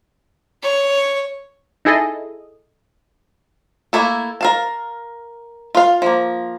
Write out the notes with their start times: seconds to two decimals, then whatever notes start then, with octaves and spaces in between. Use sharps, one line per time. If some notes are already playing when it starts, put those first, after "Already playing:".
0.63 C#5
1.85 D#4 E4 G#4 A4 D#5
3.93 A3 A#3 E4 A4
4.41 A#4 F5 A5
5.75 F4 F5
6.02 F3 A#3